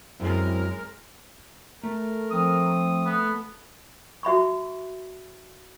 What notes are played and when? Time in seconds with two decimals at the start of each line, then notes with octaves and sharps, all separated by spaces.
0.20 F#2 F#3 G#3 C4 C#4 E4 A#4
1.84 A3 A#4
2.31 F3 C4 D#6
3.06 B3
4.23 F#4 E5 B5 C#6